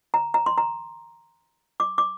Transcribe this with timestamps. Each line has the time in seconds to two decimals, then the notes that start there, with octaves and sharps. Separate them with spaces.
0.14 A#5
0.34 A#5
0.46 C6
0.58 A#5
1.80 D6
1.98 D6